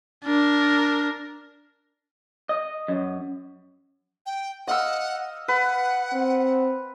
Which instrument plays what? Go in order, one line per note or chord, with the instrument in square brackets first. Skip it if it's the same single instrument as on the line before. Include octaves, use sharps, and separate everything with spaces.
[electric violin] D4 A#4
[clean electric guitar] D#5
F#2
[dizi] G5
[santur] D#5 F5 E6 [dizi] F#5
[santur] B4 [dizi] F#5
[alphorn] C4